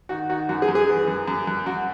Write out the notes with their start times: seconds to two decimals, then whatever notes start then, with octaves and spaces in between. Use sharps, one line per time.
0.09 D#3 F#4
0.29 D#3 F#4
0.49 F#2 F#4
0.62 G#4
0.68 F#2
0.75 G#4
0.89 E3
1.08 F#2
1.28 F#2
1.47 F#2
1.66 F#2 F#4